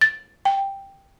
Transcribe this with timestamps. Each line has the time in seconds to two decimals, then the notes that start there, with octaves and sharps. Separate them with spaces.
0.01 A6
0.45 G5